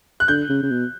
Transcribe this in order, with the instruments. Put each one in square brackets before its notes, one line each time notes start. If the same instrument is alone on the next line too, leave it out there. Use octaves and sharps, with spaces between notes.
[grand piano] F#6
[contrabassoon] D3 [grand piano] G6
[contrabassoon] C#3
C#3
B2